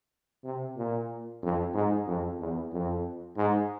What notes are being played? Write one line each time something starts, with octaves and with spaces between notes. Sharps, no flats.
C3
A#2
F2
G#2
F2
E2
F2
G#2